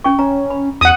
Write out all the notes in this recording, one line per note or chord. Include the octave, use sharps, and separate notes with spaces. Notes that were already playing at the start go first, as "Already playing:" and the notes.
C#4 G5 C#6
C#4 A#5
B5
E2 F#5 D#6